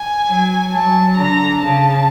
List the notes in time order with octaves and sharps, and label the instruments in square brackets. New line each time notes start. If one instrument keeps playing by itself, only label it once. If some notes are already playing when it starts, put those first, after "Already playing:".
Already playing: [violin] G#5
[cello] F#3
[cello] F#3 [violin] A5
[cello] D3 [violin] A#5
[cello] C#3 [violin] A5